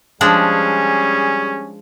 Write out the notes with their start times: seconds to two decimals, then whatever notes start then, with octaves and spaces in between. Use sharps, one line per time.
0.21 F3 G3 G#3 C#4 D4 G#4